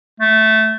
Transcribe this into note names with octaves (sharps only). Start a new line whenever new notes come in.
A3